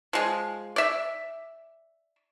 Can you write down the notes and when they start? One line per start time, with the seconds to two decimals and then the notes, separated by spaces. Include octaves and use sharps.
0.13 F3 G#3
0.76 D5 E5